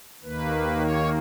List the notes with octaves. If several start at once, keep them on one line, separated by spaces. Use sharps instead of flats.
D#2 D#3 A#3 B4
C#5